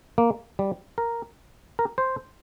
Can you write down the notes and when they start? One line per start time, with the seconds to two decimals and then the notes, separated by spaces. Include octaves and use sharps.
0.18 A#3
0.59 G3
0.98 A#4
1.79 A#4
1.98 C5